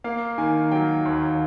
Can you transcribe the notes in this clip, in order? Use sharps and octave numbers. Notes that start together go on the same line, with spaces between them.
A#3 F5
D#3 G#5
F#3 G5
D#2